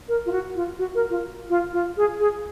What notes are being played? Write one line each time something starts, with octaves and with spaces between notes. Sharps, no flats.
A#4
F4
F#4
F4
F#4
A#4
F4
F4
F4
G#4
G#4